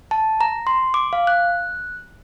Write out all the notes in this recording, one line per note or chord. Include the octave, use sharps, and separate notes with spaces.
A5
A#5
C6
D6
F5
F#6